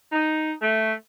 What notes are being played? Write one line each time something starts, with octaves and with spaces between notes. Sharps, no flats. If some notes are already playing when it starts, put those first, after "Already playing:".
D#4
A3